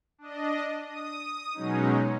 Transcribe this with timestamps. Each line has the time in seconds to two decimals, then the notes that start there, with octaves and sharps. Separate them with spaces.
0.18 D4 D#5
0.85 D#6
1.54 B2 F#3 G#3 C#4 D#4